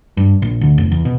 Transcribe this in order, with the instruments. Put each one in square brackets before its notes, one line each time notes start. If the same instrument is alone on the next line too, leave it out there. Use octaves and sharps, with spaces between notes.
[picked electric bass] G2
A#1
D2
F1
E2
B2